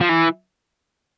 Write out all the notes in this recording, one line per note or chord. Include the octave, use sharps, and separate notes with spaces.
F3
E3